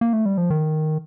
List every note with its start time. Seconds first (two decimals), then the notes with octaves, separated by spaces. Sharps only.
0.01 A#3
0.13 A3
0.26 G3
0.38 F3
0.50 D#3